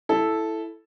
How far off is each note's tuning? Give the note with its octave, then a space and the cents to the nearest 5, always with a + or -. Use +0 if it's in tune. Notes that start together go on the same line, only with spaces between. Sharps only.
E4 +0 A4 -5